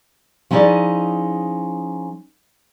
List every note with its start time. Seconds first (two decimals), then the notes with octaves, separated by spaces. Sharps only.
0.51 F3 C#4 D#4 E4 G#4 D5